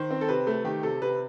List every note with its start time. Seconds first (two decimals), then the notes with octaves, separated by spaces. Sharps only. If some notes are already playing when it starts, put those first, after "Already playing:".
Already playing: D#3 C5
0.11 C4
0.21 A4
0.29 C3 B4
0.47 A3
0.64 D#3 G4
0.83 C3 A4
1.02 C3 B4